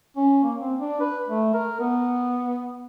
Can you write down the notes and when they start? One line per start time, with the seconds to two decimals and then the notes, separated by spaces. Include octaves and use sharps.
0.17 C#4
0.43 A#3
0.61 C4
0.79 D4
1.01 B4
1.28 A3
1.54 A#4
1.80 B3